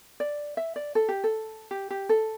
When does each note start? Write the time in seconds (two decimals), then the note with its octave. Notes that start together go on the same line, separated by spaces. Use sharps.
0.20 D5
0.57 E5
0.76 D5
0.95 A4
1.09 G4
1.24 A4
1.71 G4
1.90 G4
2.09 A4